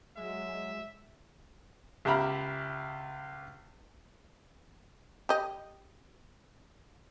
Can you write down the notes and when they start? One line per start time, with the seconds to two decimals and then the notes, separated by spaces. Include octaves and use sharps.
0.17 F#3 G#3 E5
2.05 C#2 G4 E5 A#5 B5 F6
5.29 G4 D#5